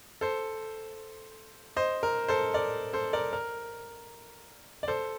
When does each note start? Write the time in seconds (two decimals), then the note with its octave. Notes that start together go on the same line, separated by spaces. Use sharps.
0.21 A4 C5
1.77 C5 D#5
2.03 A#4
2.28 A4 C5
2.54 A#4 D5
2.93 A4 C5
3.13 A#4 D5
3.33 A#4
4.83 D5
4.88 A4 C5